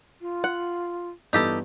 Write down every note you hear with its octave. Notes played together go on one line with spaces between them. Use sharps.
F4
F#5
G2 E3 B3 D#4 G4 A4